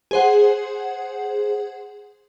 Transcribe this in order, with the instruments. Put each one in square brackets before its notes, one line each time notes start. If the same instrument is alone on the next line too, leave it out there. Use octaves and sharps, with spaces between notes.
[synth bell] G#4 C5 F#5